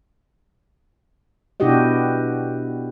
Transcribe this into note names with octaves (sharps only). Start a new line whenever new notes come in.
B2 D4 E4 F#4 G4 D#5